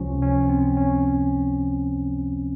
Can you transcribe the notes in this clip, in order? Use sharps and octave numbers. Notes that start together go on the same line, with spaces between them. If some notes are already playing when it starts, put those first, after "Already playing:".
Already playing: C#2 C3 F3 C#4
C#4
C4
C#4